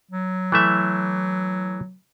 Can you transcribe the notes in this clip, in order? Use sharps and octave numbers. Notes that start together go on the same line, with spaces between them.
F#3
E3 A3 E5